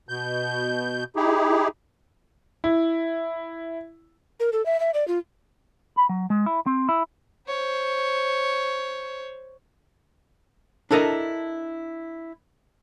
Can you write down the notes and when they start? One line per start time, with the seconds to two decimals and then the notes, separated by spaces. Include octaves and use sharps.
0.09 B2 G6
1.16 D#4 E4 G4 G#4
2.64 E4
4.40 A#4
4.53 A4
4.66 E5
4.80 E5
4.94 D5
5.08 F4
5.96 B5
6.09 F#3
6.30 G#3
6.46 E4
6.66 C4
6.89 E4
7.48 C5 C#5
10.91 D4 E4 A4 A#4 D#5